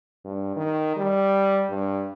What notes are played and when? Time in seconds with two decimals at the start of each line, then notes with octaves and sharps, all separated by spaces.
0.25 G2
0.56 D#3
0.97 G3
1.69 G2